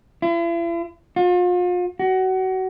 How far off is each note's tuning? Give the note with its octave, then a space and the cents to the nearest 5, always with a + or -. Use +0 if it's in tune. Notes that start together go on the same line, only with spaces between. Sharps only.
E4 +45
F4 +40
F#4 +25